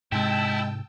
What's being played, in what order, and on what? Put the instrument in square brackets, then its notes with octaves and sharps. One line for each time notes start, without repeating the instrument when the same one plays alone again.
[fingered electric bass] G#2 C3 [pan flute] G#3 [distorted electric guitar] E4 [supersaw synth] G5 A5 E6